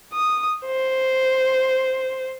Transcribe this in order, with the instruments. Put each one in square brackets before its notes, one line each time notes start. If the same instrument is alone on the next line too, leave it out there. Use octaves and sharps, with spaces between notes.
[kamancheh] D#6
C5